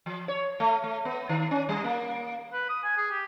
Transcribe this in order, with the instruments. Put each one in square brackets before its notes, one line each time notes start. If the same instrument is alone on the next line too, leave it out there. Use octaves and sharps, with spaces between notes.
[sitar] F3
C#5
A3
A3
B3
D#3
C#4
G3
A#3
[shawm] B4
D#6
G#5
G#4
G4